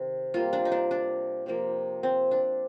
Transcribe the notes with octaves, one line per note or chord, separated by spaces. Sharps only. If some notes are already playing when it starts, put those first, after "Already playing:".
Already playing: C3 D#3
C3 G3 A#3 F4
D4
D#4
D4
D4
C3 F3 A#3
C4
D4